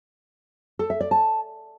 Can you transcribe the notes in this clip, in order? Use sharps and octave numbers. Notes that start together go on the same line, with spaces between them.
A4
E5
D5
A5